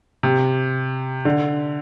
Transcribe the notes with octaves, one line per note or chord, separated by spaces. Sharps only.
C3
D3